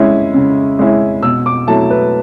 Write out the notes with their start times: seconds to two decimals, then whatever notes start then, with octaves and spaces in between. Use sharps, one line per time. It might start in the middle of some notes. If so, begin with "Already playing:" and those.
Already playing: C#3 G#3 C#4 E4
0.34 C#3
0.79 G#3 C#4 E4
1.23 B2 E6
1.46 D6
1.67 F#3 A3 E4 A5
1.90 B4